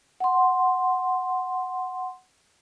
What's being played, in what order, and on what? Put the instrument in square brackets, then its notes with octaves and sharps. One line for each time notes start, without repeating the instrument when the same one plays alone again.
[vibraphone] F#5 C6